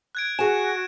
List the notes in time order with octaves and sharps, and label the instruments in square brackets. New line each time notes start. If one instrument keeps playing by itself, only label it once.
[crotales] F#6 G#6 D7
[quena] F#4 [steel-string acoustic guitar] G#4 G#5 [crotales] E7